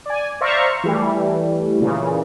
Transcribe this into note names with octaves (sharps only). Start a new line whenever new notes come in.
D5 G#5
C5 D5 E5 F5 A#5 C#6
E3 G3 A3
A#2 C#3 E3